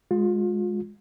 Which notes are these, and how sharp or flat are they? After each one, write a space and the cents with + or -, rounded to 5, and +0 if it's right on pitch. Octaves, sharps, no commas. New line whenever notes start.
G#3 +0 F4 +35